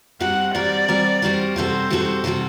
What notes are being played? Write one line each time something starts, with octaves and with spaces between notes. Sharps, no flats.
G3 C4 F#4 A#4 F#5
G3 C4 F#4 A#4 D5
G3 C4 F#4 A#4
G3 C4 F#4 A#4
C3 G3 C4 F#4 A4 C5
C3 G3 C4 F#4 A4
C3 G3 C4 F#4 A4